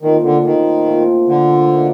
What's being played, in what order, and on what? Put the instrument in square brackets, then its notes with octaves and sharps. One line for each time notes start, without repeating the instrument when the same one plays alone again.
[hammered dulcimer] A#2 F3 A3 C4 [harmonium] D#3
[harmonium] D3
[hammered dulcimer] A#2 F3 A3 C4 [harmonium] D#3
[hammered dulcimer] A#2 F3 A3 C4
[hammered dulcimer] A#2 F3 A3 C4 [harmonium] D3
[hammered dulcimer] A#3 D#4 F#4